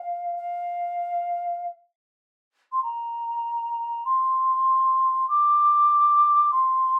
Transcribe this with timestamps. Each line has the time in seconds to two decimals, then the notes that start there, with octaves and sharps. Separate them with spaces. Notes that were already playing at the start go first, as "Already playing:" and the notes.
Already playing: F5
0.37 F5
2.72 C6
2.83 A#5
4.05 C6
5.28 D6
6.52 C6